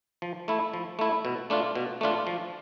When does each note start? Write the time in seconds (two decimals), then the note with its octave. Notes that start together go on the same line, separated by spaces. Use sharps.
0.22 F3
0.48 A3 E4
0.73 F3
0.99 A3 E4
1.25 B2
1.50 A3 D4 F4
1.75 B2
2.01 A3 D4 F4
2.27 F3